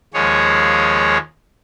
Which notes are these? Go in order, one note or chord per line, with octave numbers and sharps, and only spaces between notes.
D#2 F3 G#3 G#4 C#5